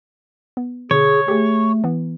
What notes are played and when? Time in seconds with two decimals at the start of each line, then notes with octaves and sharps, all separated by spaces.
0.57 B3
0.91 B2 D3 G#4 C#5
1.28 A3 G4 G#4
1.84 E3 B3